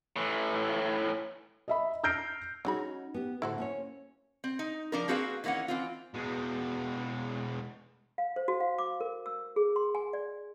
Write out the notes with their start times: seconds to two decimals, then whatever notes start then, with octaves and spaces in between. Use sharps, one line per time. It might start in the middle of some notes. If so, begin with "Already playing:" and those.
0.16 A2 E3
1.68 D#5 E5 B5
2.04 E6 F6 G6 A#6 C7 D7
2.65 F#3 G#3 C#4 D#4 F#4 B5
3.14 B3 G4
3.42 A2 D3 E4 F#4 A4 C5
3.58 A#3 C#4 C#5
4.44 C4
4.59 D#4
4.92 F3 D4 A#4
5.08 A#3 C4 F#4 G#4 B4 F5
5.44 D#3 E3 A#3 C#4 F#5
5.68 E3 C4 F4
6.14 B2 G#3
8.18 F5
8.36 C5
8.48 F#4
8.60 F5
8.78 D6
9.01 A#4
9.26 E6
9.56 G#4
9.76 C6
9.95 G#5
10.13 D5